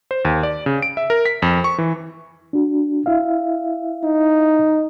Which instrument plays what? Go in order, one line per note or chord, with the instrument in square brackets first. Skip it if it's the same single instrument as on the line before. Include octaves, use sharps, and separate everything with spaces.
[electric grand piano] C5
D#2
D5
C#3
D7
E5
A#4
B6
F2
C#6
E3
[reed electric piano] D4 F#4
E4 E5 F5
[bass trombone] D#4